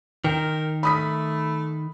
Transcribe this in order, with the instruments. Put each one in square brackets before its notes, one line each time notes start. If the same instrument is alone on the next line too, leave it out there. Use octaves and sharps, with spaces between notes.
[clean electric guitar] D#3 [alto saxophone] A#4 [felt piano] G5
[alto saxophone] A3 [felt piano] B5 D#6 B6